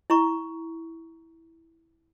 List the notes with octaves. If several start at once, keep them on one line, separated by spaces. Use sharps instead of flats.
E4 A#5 C#6